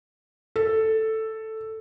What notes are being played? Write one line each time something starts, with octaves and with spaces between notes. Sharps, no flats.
A4